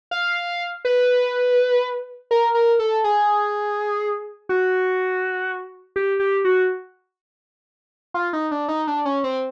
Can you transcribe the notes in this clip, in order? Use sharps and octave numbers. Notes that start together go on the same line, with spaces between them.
F5
B4
A#4
A#4
A4
G#4
F#4
G4
G4
F#4
F4
D#4
D4
D#4
D4
C#4
C4